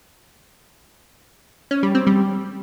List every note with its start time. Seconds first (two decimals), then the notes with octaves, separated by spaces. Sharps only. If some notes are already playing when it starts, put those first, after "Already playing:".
1.71 C#4
1.83 G3
1.95 C4
2.07 G3